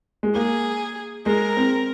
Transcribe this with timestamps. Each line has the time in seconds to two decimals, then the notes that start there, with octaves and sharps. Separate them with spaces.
0.23 G#3
0.35 A#3 G#4
1.26 G#3 A#4
1.57 C4